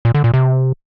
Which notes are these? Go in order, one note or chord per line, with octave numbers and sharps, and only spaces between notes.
A#2
D3
A#2
C3